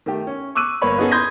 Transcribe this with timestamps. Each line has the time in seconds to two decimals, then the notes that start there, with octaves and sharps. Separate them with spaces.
0.06 D#3 A3 G4
0.27 C#4
0.55 C#6 D6 E6 F#6 D#7
0.82 G1 A#3 B4 C#5 B5
0.98 B3 C#4 D#4 G#4 A4
1.11 B4 C6 D#6 G6 G#6 A#6